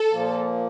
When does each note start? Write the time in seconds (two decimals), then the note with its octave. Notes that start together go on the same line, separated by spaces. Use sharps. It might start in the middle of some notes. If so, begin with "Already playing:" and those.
Already playing: A4
0.12 A#2 F3 A#3